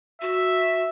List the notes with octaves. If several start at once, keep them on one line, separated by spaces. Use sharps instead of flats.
F#4 E5